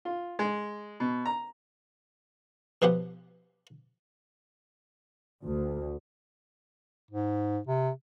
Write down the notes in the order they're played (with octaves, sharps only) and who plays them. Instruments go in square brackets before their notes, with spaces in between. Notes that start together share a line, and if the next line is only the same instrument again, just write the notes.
[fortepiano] F4
G#3
B2
A#5
[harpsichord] B2 F3 B3 G4 F#5
[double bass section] D2
[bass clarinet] G#2
C3